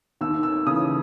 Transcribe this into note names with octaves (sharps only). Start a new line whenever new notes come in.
D#2 E6
E6
C#3 E3 D#6